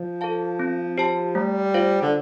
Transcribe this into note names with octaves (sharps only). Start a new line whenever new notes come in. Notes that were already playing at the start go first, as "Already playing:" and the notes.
Already playing: F3
A4 F5 A5
C4
G4 C5 A5
G3 A3
F4 C5 F5
D3